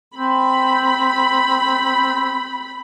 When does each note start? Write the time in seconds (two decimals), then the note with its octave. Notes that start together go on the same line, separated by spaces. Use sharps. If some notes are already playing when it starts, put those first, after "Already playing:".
0.16 C4 B5